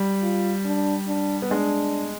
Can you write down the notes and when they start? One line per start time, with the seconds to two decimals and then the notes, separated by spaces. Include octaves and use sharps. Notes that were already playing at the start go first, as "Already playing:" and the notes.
Already playing: G3
0.22 F4
0.65 D4
1.07 D4
1.42 B3
1.51 G#3 D4